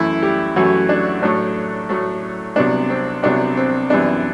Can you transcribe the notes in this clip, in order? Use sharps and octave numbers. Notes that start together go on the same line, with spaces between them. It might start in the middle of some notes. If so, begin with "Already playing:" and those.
Already playing: F#2 E3 A3 E4
G3 G4
F#2 E3 F#3 A3 F#4
D4
A2 F#3 A3 D4
A2 F#3 A3
C2 C3 F#3 B3 D4
C4
C2 C3 F#3 B3 D4
C4
F#2 E3 G3 B3 D4